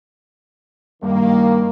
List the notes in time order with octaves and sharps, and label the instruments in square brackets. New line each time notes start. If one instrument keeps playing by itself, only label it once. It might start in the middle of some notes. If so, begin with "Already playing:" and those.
[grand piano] G2 [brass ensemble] D#3 A#3